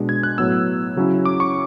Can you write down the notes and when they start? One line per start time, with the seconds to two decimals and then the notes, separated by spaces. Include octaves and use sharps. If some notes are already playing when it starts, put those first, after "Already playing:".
Already playing: B2 G#3 D4
0.09 G#6
0.23 F#6
0.38 A2 F#3 B3 E6
0.96 C#3 F#3 C#4 E4
1.25 D6
1.40 C#6